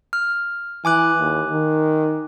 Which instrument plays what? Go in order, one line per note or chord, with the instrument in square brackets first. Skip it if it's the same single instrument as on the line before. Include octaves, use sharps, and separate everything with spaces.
[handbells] F6
[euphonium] E3 [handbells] G#5 D6 F#6
[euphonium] D#2
D#3